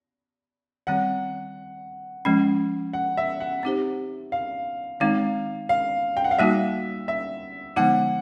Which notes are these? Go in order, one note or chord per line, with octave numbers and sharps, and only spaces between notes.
D#3 G3 C4 F#5
F3 G#3 C#4
F#5
E5
F#5
C4 D#4 G4 C5
F5
D#3 G#3 C4 D#4 F5
F5
G5
F#5
F5
G3 A#3 D#4 F#4 E5
E5
D3 F3 G#3 B3 D#4 F#5